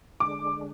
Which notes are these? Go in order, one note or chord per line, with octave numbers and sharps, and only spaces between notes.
D3 G#3 D4 D6